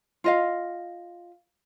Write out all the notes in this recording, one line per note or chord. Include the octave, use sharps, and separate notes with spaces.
F4 D#5 F5